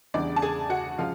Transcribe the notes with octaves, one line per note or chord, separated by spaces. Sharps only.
E2 C#3 E3 G3 D4 D5
A5
G#4 G#5
F#4 F#5
C#3 F3 G#3 F4 F5